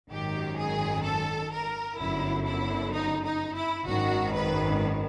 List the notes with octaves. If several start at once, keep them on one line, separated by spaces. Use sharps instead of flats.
G#1 F#2 D#3 G4
G#4
A4
A#4
G1 F#2 D3 E4
E4
D#4
D#4
E4
G#1 F#2 D#3 F#4
B4